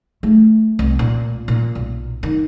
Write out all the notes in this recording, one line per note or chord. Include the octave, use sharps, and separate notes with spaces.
A3
C2
A#2
A#2
B1
D#3